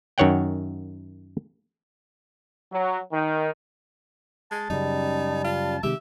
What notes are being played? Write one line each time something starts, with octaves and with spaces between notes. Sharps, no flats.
F#2 D#3 C#5 F#5 G5
F#3
D#3
G#3 A5
F#2 C#3 G3 D#4
F4
C3 D#3 G#3 G4 E5